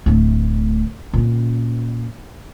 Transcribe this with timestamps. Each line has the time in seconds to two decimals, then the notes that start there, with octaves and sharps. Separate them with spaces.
0.06 D1 A3
1.13 A#2 C#4